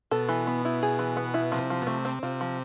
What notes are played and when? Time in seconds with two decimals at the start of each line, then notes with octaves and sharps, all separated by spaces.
0.11 B2 A4
0.29 E3
0.47 B3
0.65 E4
0.83 G#4
0.99 E3
1.17 B3
1.34 E4
1.52 C3 F3
1.70 F3
1.82 B2
1.87 C3 A3
2.05 C4
2.23 C3 F4
2.41 F3